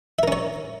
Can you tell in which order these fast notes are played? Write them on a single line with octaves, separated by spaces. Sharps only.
E5 A#4 C#4 C#5